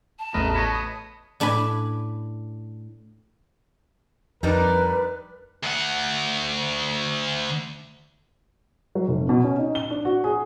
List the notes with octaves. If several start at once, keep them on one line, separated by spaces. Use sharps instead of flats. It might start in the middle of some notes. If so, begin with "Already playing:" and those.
A5
A1 E2 A3 A#4 B4 D#5
B4 C#5 D#5
D#6
A2 D4 B4 G#5 B5
F2 G3 D4 D#4 A#4 B4
D2 F#5
F#3
F1
B2
C#4
D#4
G7
D4
F#4
G#4